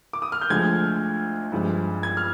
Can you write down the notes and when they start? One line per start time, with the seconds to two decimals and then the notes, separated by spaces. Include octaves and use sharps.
0.13 D6
0.22 D#6
0.32 F6
0.41 G6
0.50 D2 D3 F3 G#3 G#6
1.52 G2 F3 G#3
2.03 G#6
2.17 F6